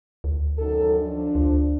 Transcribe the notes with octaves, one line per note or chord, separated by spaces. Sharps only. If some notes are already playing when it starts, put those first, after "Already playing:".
D2
F#2 D#3 A4
F3 D4
D2